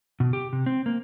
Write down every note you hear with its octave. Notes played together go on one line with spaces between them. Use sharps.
B2
G4
C3
C4
A#3